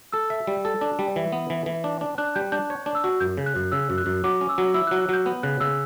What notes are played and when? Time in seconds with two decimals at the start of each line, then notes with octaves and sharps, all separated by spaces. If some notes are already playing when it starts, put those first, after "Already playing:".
0.12 A4 E6
0.30 E5
0.47 G3
0.65 A4
0.81 D4
0.99 G3
1.16 E3
1.32 B3
1.50 E3
1.66 E3
1.84 D4
2.01 D4
2.18 D4 F#6
2.35 G3 G6
2.52 D4 G6
2.70 C#5
2.86 D4
2.95 E6
3.04 F#4
3.20 F#2 G6
3.37 C#3
3.46 F#6
3.56 F#2
3.72 C#3 E6
3.90 F#2
3.98 F#6
4.06 F#2
4.24 F#3 D6
4.41 C#4
4.49 E6
4.58 F#3
4.74 E4 E6
4.87 F#3 F#6
5.00 F#6
5.09 F#3 G6
5.26 B3
5.43 C#3 F#6
5.60 C#3 E6